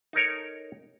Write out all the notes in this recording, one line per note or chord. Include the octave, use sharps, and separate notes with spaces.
D#4 A4 A#4 C#5